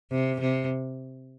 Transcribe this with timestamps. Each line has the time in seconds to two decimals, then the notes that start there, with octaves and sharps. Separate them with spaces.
0.11 C3
0.40 C3